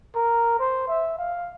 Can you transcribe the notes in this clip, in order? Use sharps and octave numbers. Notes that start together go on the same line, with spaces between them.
A#4
C5
E5
F5